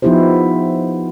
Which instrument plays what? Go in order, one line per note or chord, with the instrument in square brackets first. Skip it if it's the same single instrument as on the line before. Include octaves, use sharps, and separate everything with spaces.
[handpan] F3 B3 D#4 E4 G4 C5